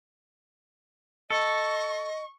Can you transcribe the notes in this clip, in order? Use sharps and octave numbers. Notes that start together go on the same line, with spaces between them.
A4 D#5 C#6